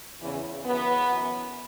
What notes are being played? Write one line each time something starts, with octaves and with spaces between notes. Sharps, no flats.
E2 C#3 E3
F#2 C#3 E3 B3
F#2 E3